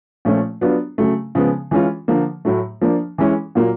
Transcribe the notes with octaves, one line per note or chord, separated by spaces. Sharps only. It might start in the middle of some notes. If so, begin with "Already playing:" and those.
A#2 F3 A3 C#4
F#3 B3 D4 F4
C#3 F#3 A3
C#3 F3 G#3 B3
E3 G#3 C#4 F4
D3 F3 A#3
A2 F#3 A3
F3 A#3 D4
E3 G#3 C#4 E4
A#2 F#3 A#3